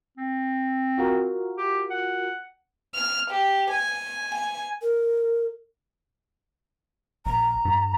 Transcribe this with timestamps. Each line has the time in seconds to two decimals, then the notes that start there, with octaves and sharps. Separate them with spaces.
0.17 C4
0.98 F4 F#4 A#4
1.58 G4
1.90 F#5
2.95 F6
3.31 G4
3.71 G#5
4.35 G#5
4.81 A#4
7.26 A#1 A#5
7.65 G2